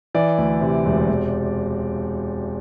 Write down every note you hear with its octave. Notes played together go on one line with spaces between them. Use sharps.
E3 D5
D2
C3
E1
E1